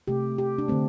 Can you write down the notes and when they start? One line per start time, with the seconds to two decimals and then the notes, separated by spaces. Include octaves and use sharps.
0.07 C3 A3 G4
0.38 G4
0.58 D4
0.68 D3 A3 C4